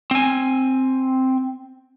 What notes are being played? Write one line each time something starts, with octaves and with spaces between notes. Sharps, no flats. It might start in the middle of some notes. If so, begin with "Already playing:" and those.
C4 G#5